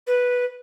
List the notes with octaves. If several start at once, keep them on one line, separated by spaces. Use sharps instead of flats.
B4